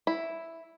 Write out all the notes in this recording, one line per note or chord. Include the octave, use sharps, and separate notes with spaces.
E4